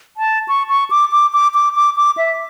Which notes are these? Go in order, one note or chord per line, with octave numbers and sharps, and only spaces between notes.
A5
C#6
C#6
D6
D6
D6
D6
D6
D6
E5